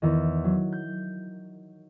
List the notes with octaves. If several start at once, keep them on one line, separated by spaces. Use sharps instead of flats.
E2 D#3
F#3
G6